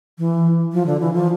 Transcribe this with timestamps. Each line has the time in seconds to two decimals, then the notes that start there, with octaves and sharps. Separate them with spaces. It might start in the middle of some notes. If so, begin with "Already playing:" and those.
0.18 E3
0.73 F3
0.86 D3
1.00 E3
1.14 F3